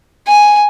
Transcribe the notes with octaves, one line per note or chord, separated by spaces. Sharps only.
G#5